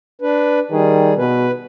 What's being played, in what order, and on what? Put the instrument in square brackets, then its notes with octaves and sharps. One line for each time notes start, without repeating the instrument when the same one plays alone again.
[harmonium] D4 B4
[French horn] D#3 [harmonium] G3 G#4
[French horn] B2 [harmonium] B4